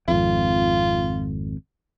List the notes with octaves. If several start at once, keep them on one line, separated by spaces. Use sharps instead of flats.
G#1 F2 F4